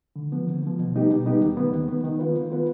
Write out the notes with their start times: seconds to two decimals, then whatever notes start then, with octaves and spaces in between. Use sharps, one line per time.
0.16 D3
0.32 F3 B3
0.47 D3
0.63 F3 B3
0.79 B2
0.95 G3 B3 D#4 G4
1.10 B2
1.26 G3 B3 D#4 G4
1.41 D#2
1.57 D#3 B3
1.72 D#2
1.88 D#3 B3
2.04 D#3
2.19 B3 F4 B4
2.35 D#3
2.51 B3 F4 B4